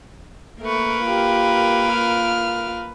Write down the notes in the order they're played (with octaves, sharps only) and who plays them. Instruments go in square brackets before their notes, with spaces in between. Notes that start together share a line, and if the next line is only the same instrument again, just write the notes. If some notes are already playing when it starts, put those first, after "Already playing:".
[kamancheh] A3 C#6 [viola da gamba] A#3 A#4 B4
[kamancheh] F4 G4
F4 F6